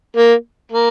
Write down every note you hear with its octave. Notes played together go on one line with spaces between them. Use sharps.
A#3
A#3